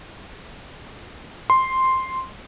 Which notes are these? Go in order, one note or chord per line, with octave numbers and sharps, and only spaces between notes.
C6